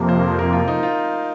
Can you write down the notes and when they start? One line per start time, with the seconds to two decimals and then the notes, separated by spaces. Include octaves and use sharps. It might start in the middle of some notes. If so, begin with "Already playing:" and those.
Already playing: F2 C3 F3 A#3
0.09 C5
0.39 A#4
0.53 F4
0.68 D#4
0.83 F4